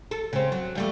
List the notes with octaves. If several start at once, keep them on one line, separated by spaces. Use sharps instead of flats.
A4
C#3 C4
F#3
F2 G3 A3